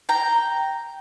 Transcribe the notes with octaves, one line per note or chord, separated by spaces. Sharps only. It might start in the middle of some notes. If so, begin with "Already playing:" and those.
G5 A#5